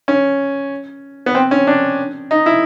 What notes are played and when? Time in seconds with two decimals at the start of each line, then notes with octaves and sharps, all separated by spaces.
0.08 C#4
1.26 B3
1.35 C4
1.51 C#4
1.67 D4
2.31 D#4
2.46 E4